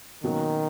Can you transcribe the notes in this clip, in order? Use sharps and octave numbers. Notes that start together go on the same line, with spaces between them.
B2 D#3 F#3 A#3 C#4